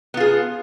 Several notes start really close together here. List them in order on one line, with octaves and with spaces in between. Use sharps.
B3 F4 G#4